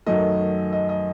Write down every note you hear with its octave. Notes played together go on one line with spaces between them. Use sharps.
F#2 D#3 F#3 A3 D#5
D#5
D#5